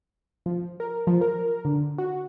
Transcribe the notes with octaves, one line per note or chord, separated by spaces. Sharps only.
F3
A#4
F3
A#4
D3
F#4